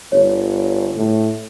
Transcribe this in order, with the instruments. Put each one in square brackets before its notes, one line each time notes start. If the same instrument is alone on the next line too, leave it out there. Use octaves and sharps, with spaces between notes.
[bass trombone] G1 [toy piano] C#5
[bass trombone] A2